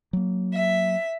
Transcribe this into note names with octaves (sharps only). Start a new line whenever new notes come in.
F#3 A#3
E5